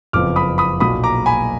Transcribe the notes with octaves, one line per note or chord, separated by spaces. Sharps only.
F#1 F2 F3 B3 D6 F6
B5 D#6
B5 D#6
B1 A#2 F#3 A#3 B5 D#6
A#5 D6
G#5 B5